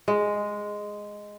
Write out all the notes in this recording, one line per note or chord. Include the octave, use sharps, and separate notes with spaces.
G#3